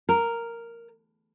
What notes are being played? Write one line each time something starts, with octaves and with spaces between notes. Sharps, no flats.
A#4